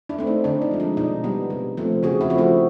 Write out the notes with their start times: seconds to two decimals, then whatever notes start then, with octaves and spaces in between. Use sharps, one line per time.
0.09 D4 E4
0.18 A3 C4
0.27 D#4
0.44 D3 D4
0.62 D#4
0.71 F3 G#3
0.80 D4
0.97 B2 D#4
1.24 G3 B3
1.50 C3
1.77 F3 A3 C4
2.03 C#3 F#4 G#4
2.21 E4 F#4
2.30 F3 A3 C4
2.38 E4 F#4